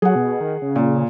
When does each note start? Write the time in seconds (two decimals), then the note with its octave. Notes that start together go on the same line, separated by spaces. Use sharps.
0.02 F#3 G#4 F#5
0.15 B2
0.41 D#3
0.62 C#3
0.76 A#2